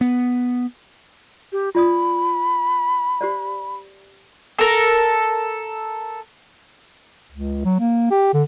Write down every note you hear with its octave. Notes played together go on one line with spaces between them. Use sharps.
B3
G4
F4 D5 B5 D#6
G4 C5 D5
A4 A#4
C#2
F#3
A#3
G4
D3